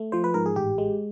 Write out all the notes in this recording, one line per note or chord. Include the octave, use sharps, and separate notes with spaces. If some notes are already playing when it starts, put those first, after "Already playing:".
Already playing: A3
F3 C5
B4
G#2 A#4
G#4
A1 G4
G#3